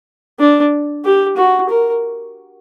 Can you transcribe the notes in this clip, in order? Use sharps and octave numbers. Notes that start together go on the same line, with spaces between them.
D4
G4
F#4
A#4